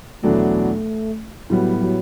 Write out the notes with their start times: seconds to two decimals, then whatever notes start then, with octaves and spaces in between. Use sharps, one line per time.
0.22 E2 B2 F#3 A3 B3 D4
1.50 A2 F#3 G3 B3
1.81 F#3